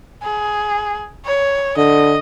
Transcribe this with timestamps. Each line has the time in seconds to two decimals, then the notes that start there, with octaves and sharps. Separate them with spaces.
0.23 G#4
1.25 C#5
1.77 D3 D#5